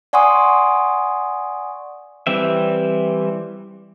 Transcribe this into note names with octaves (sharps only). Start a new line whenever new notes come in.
D5 F#5 G#5 C6 C#6 D#6
E3 G3 C4 E5